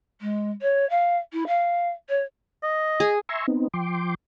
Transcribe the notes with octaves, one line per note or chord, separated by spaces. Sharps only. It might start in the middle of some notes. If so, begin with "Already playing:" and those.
G#3
C#5
F5
E4
F5
C#5
D#5
G#4
E5 G#5 A#5 C6 C#6 E6
B3 C4 D#4
F3 G5 C6 D6